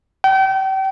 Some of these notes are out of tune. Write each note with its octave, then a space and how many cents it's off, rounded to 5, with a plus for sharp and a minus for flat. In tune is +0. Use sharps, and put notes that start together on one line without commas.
G5 -35